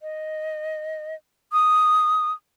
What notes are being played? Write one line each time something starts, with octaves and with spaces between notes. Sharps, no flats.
D#5
D#6